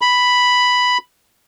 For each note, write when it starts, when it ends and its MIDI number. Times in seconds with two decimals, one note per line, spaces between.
0.01 0.98 83